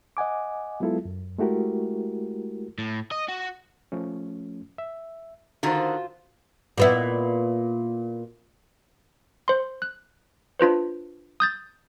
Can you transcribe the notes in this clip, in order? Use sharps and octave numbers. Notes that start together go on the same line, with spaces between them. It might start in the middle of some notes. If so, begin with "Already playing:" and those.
D#5 F#5 G#5 D6
F#3 G#3 B3 E4 F4 A4
F#2
G#3 A3 E4 F#4 G4 A#4
A2
D#5
F#4
F3 A3 C#4
E5
D3 D#3 F4 F#4 C5
A#2 B3 E4
C5 C6
F#6
D4 F4 B4 C5
D#6 G6 A6